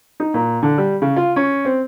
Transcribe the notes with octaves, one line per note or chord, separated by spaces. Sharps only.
D#4
A#2
D3
G3
C#3
F4
C#4
C4